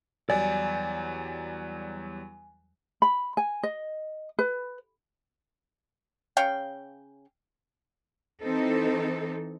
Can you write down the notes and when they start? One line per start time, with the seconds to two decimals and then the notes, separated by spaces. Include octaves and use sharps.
0.30 E2 F#3 G3 D5 G#5
3.02 B5
3.37 G#5
3.63 D#5
4.39 B4
6.37 C#3 C#5 F5 G5
8.42 E3 C4 D#4 A4